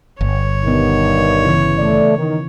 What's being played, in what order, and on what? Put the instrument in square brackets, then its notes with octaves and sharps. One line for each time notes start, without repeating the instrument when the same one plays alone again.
[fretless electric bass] G1 [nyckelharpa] C#5
[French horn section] G2 D#3 [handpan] B2 B3
[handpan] C#3 E3 E4
[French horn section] A3 D5
D#3